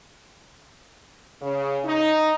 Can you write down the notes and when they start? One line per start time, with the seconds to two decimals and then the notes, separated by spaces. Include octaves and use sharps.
1.41 C#3
1.85 D#4